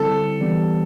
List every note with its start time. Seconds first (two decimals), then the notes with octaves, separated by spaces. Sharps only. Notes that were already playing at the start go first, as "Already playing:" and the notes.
Already playing: D3 G3 C4 E4 A4
0.40 E3 G3 B3 D4 G4